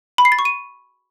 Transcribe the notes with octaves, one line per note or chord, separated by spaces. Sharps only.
B5
C7
A6
C#6
D#7